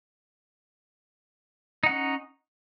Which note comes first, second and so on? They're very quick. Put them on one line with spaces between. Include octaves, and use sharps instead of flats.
D#4 F#5 C#4